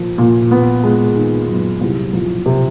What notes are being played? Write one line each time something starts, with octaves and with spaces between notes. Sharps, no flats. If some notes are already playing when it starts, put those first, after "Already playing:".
Already playing: A#2 F3 A#3
A#2
B3
G#3
D#3
F#2
C2
F3
C3